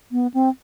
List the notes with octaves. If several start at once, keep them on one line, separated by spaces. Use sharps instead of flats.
B3
C4